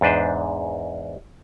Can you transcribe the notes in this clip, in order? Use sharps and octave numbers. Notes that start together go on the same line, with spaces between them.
E2 G#2 D4 B4 C5